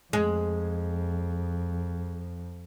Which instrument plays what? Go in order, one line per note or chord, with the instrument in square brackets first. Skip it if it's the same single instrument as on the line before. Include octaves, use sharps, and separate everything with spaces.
[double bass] F2 [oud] G#3